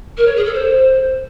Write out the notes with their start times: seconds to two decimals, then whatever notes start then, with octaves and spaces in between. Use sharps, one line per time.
0.17 A#4
0.27 C#5
0.36 G#4
0.45 A4
0.54 C5